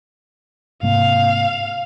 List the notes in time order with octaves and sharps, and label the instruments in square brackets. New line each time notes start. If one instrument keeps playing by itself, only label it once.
[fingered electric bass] G#2 C3 A#3 [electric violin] F5